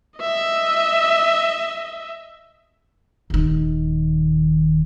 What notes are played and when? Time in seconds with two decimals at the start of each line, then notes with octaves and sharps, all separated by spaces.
0.19 D#5 E5
3.30 D#1 D#3